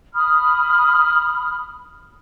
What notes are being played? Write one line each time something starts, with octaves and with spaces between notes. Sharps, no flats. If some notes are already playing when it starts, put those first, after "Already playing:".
B5 D#6 F6